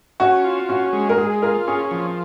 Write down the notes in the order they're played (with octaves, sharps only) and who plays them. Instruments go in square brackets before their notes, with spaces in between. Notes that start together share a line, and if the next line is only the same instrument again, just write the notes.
[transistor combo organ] C#4 [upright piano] F#4
[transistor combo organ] F4
[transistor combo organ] C#4 [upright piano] F#4
[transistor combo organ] G#3
[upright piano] A#4
[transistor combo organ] G#3 [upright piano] G#4
[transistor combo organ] F4 [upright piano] A#4
[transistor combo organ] C#4 [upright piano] G#4
[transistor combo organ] F3